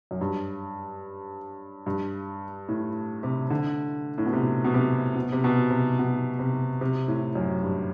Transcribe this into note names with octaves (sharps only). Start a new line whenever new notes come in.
F#2
G2
G2
A2
C3
D3
A2
B2
C3
B2
C3
B2
C3
B2
C3
B2
C3
C3
A2
F#2
G2